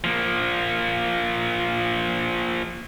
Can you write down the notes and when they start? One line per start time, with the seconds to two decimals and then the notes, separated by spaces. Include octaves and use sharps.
0.04 F3 A#3